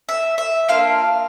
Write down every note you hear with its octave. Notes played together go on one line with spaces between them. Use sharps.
E5
E5
A#3 D4 F4 F5